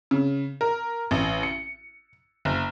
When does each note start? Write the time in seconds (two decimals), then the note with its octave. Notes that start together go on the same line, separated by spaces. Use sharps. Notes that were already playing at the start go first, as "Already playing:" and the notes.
0.11 C#3
0.61 A#4
1.11 A1
1.43 C#7
2.45 F#1